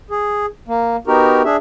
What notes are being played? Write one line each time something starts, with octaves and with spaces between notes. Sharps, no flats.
G#4
A#3
B3 D#4 F#4 G4 A#4
D4 G#4 E5